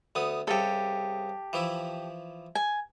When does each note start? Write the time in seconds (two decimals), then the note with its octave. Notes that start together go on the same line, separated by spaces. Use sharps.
0.15 D2 B3 D#6
0.47 C2 C#3 G4 A4
1.53 E3 F3 E4
2.55 G#5